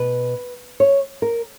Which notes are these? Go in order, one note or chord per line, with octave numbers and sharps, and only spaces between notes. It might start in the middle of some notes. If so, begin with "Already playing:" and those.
Already playing: B2 B4
C#5
A#4